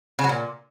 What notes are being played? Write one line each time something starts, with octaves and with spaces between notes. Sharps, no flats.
C#3
F#3
A#2